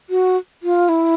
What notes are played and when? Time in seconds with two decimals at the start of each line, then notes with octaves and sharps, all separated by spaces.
0.10 F#4
0.63 F4
0.89 E4